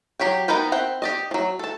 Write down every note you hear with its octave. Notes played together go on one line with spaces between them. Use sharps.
F#3 G4 C#5 G5
B3 D#4 A#4 B4 G5
C4 F#5 G5
G4 D5 D#5
F3 F#3
A4 A5